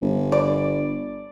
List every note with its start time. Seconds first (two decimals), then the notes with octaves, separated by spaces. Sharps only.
0.02 G1
0.32 D5